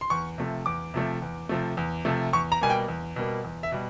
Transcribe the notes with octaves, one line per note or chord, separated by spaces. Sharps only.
C6
E2 C#6
C3 F3 A3
E2 D6
C3 F3 A3
E2
C3 F3 A3
E2
C3 F3 A3
E2 C#6
A#5
B2 G3 A#3 G#5
G5
E2
B2 G3 A#3
E2
E5
B2 G3